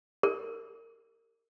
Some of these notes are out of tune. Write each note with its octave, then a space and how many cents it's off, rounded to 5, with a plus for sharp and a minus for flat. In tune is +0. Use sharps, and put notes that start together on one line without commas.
A#4 -30